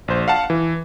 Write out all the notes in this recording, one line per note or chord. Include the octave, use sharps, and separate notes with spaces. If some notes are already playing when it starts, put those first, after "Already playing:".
A#1 C5
F5 F#5 A5
E3